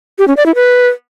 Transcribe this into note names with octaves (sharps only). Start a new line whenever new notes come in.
G4
C#4
D5
E4
B4